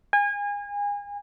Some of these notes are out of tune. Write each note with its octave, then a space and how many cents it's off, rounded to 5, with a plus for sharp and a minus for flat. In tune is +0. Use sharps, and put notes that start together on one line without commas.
G#5 -30